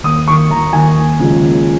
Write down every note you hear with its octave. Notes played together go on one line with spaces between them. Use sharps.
D#2 D#6
D#3 A#3 C#6
D#2 A#5
D#3 A#3 G#5
D#2
C#3 F3 G#3
D#2